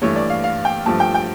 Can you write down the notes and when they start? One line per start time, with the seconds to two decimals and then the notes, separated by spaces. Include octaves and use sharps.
0.02 G2 E3 A3 C#5
0.16 D5
0.30 F5
0.44 F5
0.65 G5
0.86 G2 F3 A3 A5
1.00 G5
1.14 G5